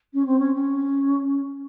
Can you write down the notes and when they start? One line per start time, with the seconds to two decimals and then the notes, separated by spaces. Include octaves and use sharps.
0.13 C#4
0.25 C4
0.39 C#4
0.54 C#4